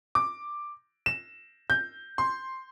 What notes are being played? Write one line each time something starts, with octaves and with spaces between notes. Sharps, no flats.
D6
E7
G6
C6